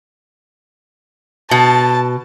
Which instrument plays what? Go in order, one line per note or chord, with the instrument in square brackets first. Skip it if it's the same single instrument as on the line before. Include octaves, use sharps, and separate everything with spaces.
[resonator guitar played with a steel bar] B2 [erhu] A5